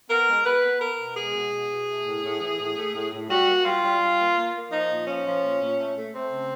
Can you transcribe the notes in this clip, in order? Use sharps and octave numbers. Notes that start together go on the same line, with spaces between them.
B3 A#4
G#3
B3 B4
B3
B3 A#4
B2
G#3 G#4
B2
B2
B2
A3
A2
A2
E3
A2
A3
A2
A2
G3 F#4
A#3
G3 F4
G3
G3
A#3
A#3
A#3
F3 D#4
A#2
F3 C#4
F3
A#2
A#2
A3
A3
A3 C4
C#3